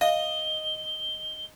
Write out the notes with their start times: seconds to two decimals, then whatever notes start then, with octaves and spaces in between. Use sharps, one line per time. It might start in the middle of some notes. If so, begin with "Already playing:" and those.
0.01 D#5 F5 G7